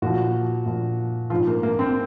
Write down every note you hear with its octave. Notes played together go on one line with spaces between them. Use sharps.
A#2 F3 F#4
A#2 F3
G#2 F3 F4
A#3
A#3
C4